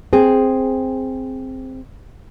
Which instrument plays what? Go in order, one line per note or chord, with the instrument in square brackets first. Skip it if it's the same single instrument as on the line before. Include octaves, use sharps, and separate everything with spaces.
[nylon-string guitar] C4 G#4